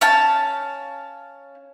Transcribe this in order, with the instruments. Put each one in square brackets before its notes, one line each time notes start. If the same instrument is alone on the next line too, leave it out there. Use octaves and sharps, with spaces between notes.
[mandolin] C#4 F5 A5